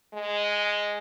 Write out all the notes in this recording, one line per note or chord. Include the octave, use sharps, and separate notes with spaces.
G#3